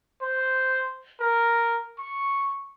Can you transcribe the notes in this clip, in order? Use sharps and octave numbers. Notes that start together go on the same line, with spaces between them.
C5
A#4
C#6